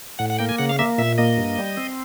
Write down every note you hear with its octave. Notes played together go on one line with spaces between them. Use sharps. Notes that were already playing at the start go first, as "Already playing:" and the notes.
A2 F#5
F#5
A#3 G5
G#5
C#3 F#5
F5
A#3 E5
A#2 E5
A#3 D#5
G2
G3
C4